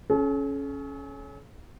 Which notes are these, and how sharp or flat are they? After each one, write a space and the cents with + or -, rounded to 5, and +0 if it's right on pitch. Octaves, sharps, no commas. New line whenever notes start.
C#4 +0 A4 -45